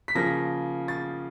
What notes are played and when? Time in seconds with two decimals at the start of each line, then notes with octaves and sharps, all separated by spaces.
0.08 B6
0.15 C#3 F3 A#3 A#6
0.88 A6